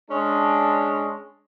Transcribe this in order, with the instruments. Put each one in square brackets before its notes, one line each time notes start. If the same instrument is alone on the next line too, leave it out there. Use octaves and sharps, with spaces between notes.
[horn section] G#3 C#4 D4